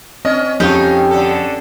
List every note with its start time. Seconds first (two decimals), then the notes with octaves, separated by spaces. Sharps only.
0.25 C4 C#4 D#5
0.60 F2 C#4 D#4 F4 G4 C#5
1.11 D3 A4